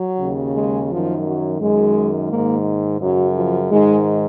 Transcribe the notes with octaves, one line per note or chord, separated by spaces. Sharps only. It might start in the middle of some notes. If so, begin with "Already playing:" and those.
Already playing: F#3
D#2 C#3
G#3
F#2 D#3 F3
F#3
F#2 D#3 G#3
G#2 D#3 A#3
F#2 C#3 F#3
F3
G#2 D#3 G#3